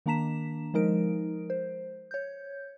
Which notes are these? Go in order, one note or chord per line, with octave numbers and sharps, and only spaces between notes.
D#3 A#3 D4 A#5 B6 E7
F3 G#3 D#4 A#4 D7
C5
C#5 G6